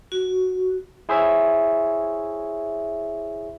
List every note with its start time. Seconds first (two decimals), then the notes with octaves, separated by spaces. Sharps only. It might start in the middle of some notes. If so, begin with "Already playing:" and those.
0.12 F#4
1.09 E4 G#4 C5 C#5 E5